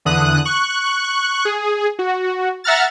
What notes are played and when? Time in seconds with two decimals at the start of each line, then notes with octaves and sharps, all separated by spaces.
0.05 E2 D3 D#6 F#6
0.45 C#6 F#6
1.45 G#4
1.99 F#4
2.64 E5 F#5 A#5 F6 A6